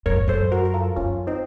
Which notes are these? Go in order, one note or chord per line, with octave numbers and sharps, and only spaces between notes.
F#2 A#4 C#5
A2
F#2 A4 C5
F#4 A#4
A#4
F4 A4
F#2 C#4 F4
C4 D#4